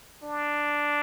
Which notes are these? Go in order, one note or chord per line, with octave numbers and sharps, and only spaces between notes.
D4